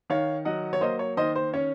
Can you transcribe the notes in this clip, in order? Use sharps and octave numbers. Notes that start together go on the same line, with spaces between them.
D#3 C#5 F5
F#3 D#5 F#5
C#5
A#3 C5 D#5
C#5
D#3 C5 D#5
C5
C#4 C#5